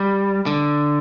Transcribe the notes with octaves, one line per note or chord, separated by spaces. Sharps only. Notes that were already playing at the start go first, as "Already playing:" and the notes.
Already playing: G3
D3